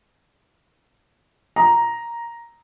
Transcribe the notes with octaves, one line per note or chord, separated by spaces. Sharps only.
A#5